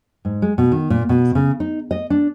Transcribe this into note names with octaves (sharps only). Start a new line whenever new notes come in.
G#2
G#3
B2
D#3
A#2
B2
C#3
D#4
D#5
D4